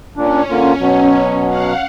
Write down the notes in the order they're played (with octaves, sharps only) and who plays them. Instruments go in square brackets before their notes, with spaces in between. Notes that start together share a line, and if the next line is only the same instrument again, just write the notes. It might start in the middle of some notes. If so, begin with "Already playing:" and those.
[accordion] A#2 D4 [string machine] C#4
[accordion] D3 A#3 F4
B2 F#3
[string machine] F5 F#5